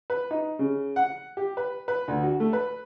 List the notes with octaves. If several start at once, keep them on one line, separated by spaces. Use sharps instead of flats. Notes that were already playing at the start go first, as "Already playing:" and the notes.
B4
D#4
C#3
F#5
G4
B4
B4
D2
F#4
A3
B4